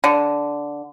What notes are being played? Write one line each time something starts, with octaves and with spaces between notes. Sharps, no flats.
D3